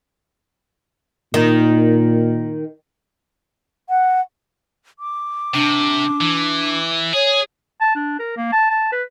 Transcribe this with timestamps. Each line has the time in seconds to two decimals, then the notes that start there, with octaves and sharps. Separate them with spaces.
1.34 A#2 D#3
3.88 F#5
4.99 D6
5.54 C3 D4
6.21 E3
7.14 G#4 C#5
7.81 A5
7.95 D4
8.19 A#4
8.37 A#3
8.52 A5
8.70 A5
8.92 B4